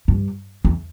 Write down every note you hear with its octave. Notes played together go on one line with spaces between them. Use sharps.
G2
E2